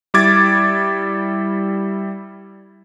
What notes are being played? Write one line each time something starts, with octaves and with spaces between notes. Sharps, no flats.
G3 E4 D6 G#6 A6